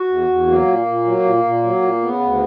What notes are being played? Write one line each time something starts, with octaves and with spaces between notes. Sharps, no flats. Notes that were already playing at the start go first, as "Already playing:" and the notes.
Already playing: F#4
E2
E2
F#3 A#3
A#2
A#2
F#3
A#2
A#2
F#3
A#2
C#3 B3
D2